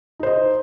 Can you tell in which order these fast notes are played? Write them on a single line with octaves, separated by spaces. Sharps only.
D#4 C5 D#5